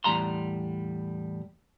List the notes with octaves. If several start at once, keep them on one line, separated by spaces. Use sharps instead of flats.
E2 A2 G3 A#5 C6